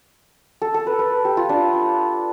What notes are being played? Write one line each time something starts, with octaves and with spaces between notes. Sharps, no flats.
A4
A4
B4
B4
G4
F4
D4